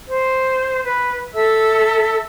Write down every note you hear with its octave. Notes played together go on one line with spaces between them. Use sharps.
C5
B4
A4 E5 E6